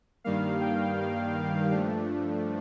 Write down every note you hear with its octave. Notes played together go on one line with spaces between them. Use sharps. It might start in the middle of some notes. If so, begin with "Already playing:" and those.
G2 D#3 G3 A#3 F5
G5
F5
F5
G2 F3 A3 D4